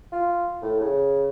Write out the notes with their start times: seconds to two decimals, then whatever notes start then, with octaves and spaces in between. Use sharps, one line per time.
0.12 F4
0.62 A2
0.81 C#3